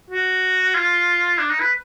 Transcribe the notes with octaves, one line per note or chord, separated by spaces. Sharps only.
F#4
F4
D4
D#4
B4